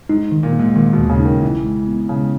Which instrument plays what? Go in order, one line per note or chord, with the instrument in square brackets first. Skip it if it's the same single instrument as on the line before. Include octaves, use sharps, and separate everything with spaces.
[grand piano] G#2 [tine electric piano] D#4
[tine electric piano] D#3
[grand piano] A#2
[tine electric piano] A#3
[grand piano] G#2
[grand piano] A#2 [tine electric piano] D#3
[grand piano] B2
[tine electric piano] D#2
[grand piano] C#3
[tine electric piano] D#4
[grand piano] D#3
[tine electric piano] B1 [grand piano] E3
[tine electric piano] G#3
B3
[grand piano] C#3 [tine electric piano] G#3